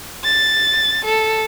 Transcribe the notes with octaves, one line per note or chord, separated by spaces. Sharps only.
A6
A4